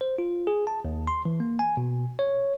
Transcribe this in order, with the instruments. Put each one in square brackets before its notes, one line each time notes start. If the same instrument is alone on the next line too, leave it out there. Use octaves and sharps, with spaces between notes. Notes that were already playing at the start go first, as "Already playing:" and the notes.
[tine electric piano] C5
F4
G#4
A5
D#2
C6
E3
A#3
G#5
B2
C#5